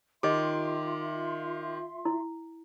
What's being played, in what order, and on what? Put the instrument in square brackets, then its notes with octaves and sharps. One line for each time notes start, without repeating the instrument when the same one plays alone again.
[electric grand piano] D#3 D6 [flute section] F4 E5 C6 [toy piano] G4 D#5
[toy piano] E4